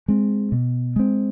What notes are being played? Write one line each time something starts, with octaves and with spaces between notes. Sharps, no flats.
G#3 C4
B2
G#3 C4